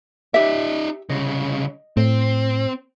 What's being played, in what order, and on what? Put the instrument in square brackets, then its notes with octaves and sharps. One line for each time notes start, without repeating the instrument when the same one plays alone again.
[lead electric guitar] D#4 D5 [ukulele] G4 E5
[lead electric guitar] C2 C#3 [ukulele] D#5
[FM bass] A2 [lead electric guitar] C4